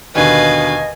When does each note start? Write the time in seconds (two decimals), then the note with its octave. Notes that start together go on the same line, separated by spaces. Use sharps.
0.15 D#2 B2 D3 B4 D#5 F5 G#5